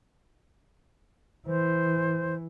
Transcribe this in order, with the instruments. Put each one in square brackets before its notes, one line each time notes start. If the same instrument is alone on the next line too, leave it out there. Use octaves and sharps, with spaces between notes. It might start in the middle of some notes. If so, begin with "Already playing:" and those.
[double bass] E3 [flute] C5